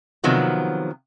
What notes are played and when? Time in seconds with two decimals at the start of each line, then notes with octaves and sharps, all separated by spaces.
0.24 C3 D#3 F3 F#3 B3